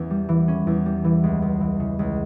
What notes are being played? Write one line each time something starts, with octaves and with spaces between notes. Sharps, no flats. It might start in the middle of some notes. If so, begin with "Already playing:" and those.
Already playing: E2 E3 C#4
G3
E3
C#4
E2
G3
E3
C#2
C#2
E3
C#3
C#2